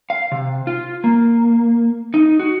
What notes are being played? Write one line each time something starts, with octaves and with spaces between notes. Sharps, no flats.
F5
C3
F4
A#3
D#4
F#4